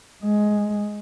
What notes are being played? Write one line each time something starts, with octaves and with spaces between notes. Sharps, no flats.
G#3